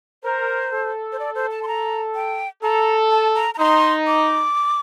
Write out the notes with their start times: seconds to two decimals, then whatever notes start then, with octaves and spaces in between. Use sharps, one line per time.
0.23 A#4 C5
0.72 A4
1.12 C5
1.19 D5
1.35 C5
1.51 A5
1.63 C6
1.67 A#5
2.15 G5
2.63 A4 A#5
3.11 A5
3.35 A#5
3.55 A#5
3.59 D#4 C6
4.07 D6